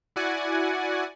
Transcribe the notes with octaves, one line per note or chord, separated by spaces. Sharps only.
E4 F#4 D5 F#5 G#5